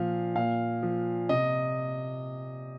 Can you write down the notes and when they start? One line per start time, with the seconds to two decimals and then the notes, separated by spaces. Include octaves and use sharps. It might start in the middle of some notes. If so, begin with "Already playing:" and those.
Already playing: A#2 F3 F5
0.35 A#2 F5
0.83 F3
1.29 C3 D#5